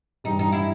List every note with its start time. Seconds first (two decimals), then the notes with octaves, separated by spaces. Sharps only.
0.24 G2 E3 G3 D#4
0.39 D#4
0.52 E4